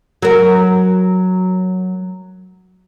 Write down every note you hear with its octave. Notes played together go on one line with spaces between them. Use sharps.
F#3 A#4